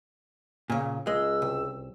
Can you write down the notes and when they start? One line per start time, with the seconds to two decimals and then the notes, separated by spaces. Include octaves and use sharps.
0.70 A#2 C#3
1.07 C#2 G#3 E6
1.42 C2